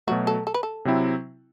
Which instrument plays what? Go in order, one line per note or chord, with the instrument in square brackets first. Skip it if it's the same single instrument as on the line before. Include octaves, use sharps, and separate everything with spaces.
[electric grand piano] B2 F#3 A3 [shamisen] F#4
[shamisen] A4
A4
B4
A4
[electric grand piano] C3 F#3 C4 E4